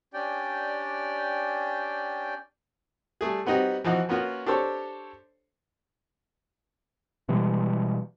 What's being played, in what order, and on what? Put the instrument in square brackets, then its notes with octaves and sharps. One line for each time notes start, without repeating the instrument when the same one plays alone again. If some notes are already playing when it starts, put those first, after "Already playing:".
[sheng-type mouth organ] C#4 D4 G4 D5 G5
[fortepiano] G3 A3 G#4
G3 B3 C4 D#4 F#4 G4
E3 F3 D#4 F#4
A#3 B3 C#4 F4 F#4
D4 G4 A4 C5 C#5
[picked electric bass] B2 E3 G3 G#3